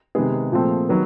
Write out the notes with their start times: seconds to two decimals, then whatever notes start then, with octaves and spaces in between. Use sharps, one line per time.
0.15 C3 D#3 G#3 B3 G#4
0.52 A#2 F3 A3 C4
0.89 D#3 F#3 B3